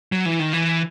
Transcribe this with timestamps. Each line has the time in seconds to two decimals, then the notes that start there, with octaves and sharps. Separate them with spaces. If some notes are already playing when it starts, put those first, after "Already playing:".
0.12 F#3
0.26 E3
0.39 D#3
0.53 E3